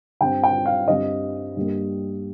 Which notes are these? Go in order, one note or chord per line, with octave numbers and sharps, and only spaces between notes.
G2 G3 C4 G5
G5
F5
G2 G3 C4 D#5
G2 G3 A#3